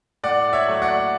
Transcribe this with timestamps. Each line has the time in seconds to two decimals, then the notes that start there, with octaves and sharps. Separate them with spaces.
0.23 A2 D5 F#5
0.53 C#5 E5
0.68 F#3 A3
0.82 D5 F#5